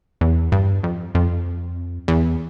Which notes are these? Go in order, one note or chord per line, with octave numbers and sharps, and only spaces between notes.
E2
G2
F2
F2
E2